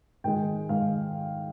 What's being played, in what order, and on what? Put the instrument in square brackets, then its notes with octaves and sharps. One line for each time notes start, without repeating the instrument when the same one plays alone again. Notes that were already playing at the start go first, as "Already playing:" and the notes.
[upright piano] G#2 D#3 G#3 G5
G#2 D#3 G#3 F5